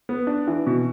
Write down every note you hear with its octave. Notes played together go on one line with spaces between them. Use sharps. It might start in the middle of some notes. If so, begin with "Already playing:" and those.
B3
D4
E3
B2